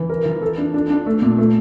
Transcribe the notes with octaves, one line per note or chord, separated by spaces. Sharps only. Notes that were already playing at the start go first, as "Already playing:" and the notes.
Already playing: E3
A#4
E3
A4
D4
D4
D4
A3
A#2
A3